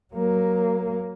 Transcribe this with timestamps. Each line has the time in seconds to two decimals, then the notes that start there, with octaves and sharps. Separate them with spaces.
0.14 F#3 A#3